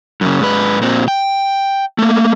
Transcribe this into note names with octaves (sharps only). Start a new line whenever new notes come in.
F#2 C#3
G#2 B4
A#2 C4
G5
A3 A#3